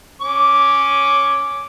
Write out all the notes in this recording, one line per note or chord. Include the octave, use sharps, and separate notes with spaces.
C#4 D6